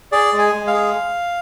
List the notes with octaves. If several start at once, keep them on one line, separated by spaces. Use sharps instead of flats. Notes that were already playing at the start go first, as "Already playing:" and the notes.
G#4 D5
G#3
G#5
G#3
F5
G#4